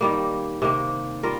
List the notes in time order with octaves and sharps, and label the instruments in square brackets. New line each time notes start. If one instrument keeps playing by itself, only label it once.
[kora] D#3 G3 A#3
C3 D#3 A#3
G3 F4 A#4